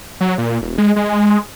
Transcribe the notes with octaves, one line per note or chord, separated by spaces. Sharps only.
F#3
A#2
E1
G#3
G#3